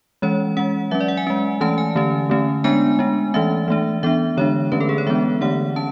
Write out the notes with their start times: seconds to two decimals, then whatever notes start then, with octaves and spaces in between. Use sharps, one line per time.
0.22 E3 G#3 C#4 C#5
0.57 G#3 C#4 F#5
0.91 F#3 C#4 E5
1.01 D5
1.08 F#5
1.17 G#5
1.27 G#3 C#4
1.61 E3 A3 C#4 A5
1.78 G#5
1.95 D3 A3 C#4
2.30 D3 A3 C#4
2.64 G#3 B3 D4 G#5
2.99 G#3 D4
3.34 E3 A3 C#4 E5
3.68 E3 A3 D4
4.03 E3 B3 D4 E5
4.37 D3 G#3 D4 C#5
4.72 D3 A3 C#4 B4
4.80 A4
4.89 G#4
4.98 C#5
5.07 E3 G#3 B3 D4 E5
5.41 D3 A3 D4 F#5
5.76 C#4 A5